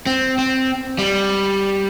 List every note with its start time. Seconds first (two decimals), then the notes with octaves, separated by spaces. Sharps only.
0.06 C4
0.38 C4
0.98 G3